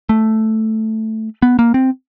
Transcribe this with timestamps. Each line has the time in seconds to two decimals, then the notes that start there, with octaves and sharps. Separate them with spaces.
0.09 A3
1.42 B3
1.59 A#3
1.74 C4